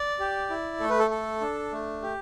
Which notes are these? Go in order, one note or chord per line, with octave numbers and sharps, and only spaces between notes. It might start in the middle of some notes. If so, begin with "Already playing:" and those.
Already playing: D5
G4
E4
A3 A4
B4
A4
A4
D4
A3
G4